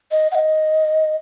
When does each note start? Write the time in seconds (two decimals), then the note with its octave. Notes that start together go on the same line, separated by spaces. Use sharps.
0.11 D#5
0.32 F#5
0.35 D#5